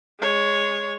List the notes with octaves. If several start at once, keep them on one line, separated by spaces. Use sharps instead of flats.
G#3 C#5